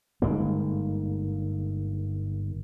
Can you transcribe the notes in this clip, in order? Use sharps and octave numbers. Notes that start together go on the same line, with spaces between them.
G1 G#2 A#3